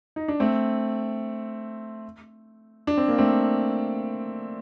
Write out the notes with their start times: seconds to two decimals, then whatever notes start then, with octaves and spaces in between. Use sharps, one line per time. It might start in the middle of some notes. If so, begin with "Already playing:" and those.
0.16 D#4
0.28 D4
0.40 A3 C4
2.87 D4
2.97 C4
3.08 A#3
3.18 A3 C4